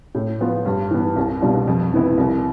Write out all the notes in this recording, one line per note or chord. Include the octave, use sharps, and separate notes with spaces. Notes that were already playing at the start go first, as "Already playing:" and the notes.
A2
F3 B3 F4
G2
E3 B3
C2
B2 G3 D4 F4
F2
C3 E3 B3 E4
C2